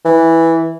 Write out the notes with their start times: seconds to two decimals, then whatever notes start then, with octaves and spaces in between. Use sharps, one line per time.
0.05 E3